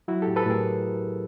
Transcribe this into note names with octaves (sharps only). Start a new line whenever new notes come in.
F#3 E4 F#4
A2 G4 A4
A4 B4
A2 G#4 A#4